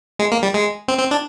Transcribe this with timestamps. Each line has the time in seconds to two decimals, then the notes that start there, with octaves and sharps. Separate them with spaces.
0.19 G#3
0.32 A#3
0.43 G3
0.54 G#3
0.88 C4
0.99 C4
1.11 D4